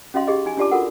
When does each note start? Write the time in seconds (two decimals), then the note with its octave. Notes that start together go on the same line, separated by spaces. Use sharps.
0.14 C#4 F#4 D#5 F5 C6
0.27 D#4 G4 G#4 D#5
0.46 D#4 G#5
0.57 D4 F4 G4 D5 A5 D6
0.71 F4 F#4 A4 A#4 F#5